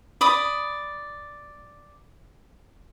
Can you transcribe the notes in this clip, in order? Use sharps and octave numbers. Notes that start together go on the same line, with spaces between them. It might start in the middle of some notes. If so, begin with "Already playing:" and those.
D5 B5 D#6